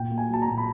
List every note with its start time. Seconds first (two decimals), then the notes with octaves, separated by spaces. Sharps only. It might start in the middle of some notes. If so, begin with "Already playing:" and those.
Already playing: A#2 G5
0.11 A#3
0.18 G#5
0.29 F#3 A5
0.42 A#5
0.48 A#2
0.58 B5